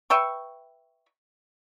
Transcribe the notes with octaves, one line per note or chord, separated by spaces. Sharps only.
B4 E5 G5 C#6